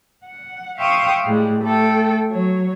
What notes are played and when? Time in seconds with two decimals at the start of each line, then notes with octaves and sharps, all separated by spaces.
0.25 F#5
0.79 E5 F5 G5 C6 C#6 D#6
1.25 A2 G3 G#3
1.62 A3 A4 G5
2.30 F#3 C#5